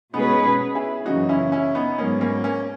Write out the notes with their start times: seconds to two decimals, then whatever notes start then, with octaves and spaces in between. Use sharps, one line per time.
0.13 B2 G#3 B3 C#4 D#4 G#4 B4
0.75 E4 G#4
1.06 F#2 C#3 E3 A#3 D#4 F#4
1.29 C#4 E4
1.52 C#4 E4
1.75 B3 D#4
1.98 G#2 F#3 A#3 B3 C#4
2.21 A#3 C#4
2.44 A#3 C#4